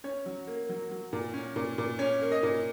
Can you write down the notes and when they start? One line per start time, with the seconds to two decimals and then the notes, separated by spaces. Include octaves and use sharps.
0.04 C#4 C#5
0.26 F#3
0.47 A#3
0.69 F#3
0.91 F#3
1.13 A#2
1.34 C#4
1.56 A#2
1.78 A#2
1.99 C#4 C#5
2.21 A#3
2.32 D#5
2.43 A#2